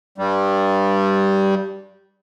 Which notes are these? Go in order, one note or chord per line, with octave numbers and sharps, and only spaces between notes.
G2 G3